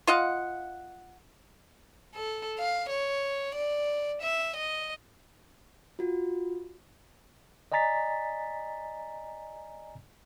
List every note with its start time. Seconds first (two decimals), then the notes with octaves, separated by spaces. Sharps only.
0.07 F4 D#5 F5 F#5
2.15 A4
2.58 F5
2.90 C#5
3.55 D5
4.22 E5
4.57 D#5
5.99 F4 F#4
7.72 D5 D#5 G#5 A#5 A6 B6